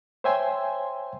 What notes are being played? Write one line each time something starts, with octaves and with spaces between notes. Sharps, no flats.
C5 C#5 E5 G5 G#5 C6